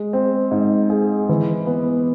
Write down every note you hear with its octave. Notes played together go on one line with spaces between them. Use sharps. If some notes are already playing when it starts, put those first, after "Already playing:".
Already playing: G#3
C4
G#2
G#4
E3
B3